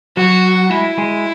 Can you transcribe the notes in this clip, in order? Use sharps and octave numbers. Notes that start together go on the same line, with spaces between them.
F#3 F#4
G#3 E4
G#3